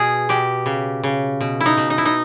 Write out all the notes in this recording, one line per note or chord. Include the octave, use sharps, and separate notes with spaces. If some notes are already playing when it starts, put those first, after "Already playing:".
Already playing: B2 G#4
B2 G4
C#3
C#3
B2
E4
D#4
B2
D#4
E4
D#4